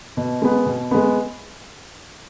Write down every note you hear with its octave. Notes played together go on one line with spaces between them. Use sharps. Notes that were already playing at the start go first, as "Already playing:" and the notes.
B2
G#3 B3
B2
G#3 B3